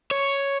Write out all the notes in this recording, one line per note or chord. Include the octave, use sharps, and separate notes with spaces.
C#5